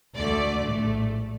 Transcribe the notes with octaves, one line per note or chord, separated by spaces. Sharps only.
D2 D3 A3 D5
A#1 A2 A3